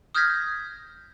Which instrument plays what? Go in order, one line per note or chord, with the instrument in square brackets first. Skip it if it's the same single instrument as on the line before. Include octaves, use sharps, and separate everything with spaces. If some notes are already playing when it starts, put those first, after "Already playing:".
[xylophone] D#6 F6 G6 G#6 A#6 B6